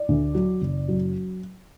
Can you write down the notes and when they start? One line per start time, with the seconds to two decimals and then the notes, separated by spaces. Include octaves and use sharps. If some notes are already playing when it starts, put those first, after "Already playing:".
Already playing: D5
0.08 D2
0.34 F#3
0.61 F#1
0.88 F#3